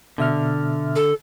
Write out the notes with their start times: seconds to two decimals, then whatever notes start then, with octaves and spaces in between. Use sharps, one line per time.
0.18 B2 D3 E5 F6
0.96 A4